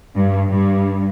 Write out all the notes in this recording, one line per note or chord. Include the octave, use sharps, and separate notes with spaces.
G2
G2